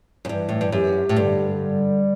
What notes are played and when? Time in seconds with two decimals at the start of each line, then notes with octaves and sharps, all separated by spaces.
0.25 F#2
0.29 G2 E3
0.49 A2
0.61 G2
0.72 F#2 G4
1.09 A2
1.16 G2 D3
1.59 G3